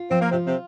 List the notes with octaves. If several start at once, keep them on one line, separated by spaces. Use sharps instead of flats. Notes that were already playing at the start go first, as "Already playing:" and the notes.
Already playing: F4
F3 C4
A#3
C3 C4 F4
C3 C4